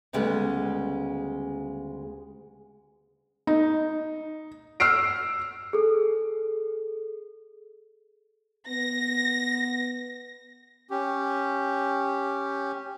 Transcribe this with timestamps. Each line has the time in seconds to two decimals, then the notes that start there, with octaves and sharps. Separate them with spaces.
0.13 D2 C#3 G3 G#3 B3
3.47 D#4
4.80 E6 F6 C7 D7
5.73 G#4 A4
8.68 B3 A#6
10.90 C#4 G4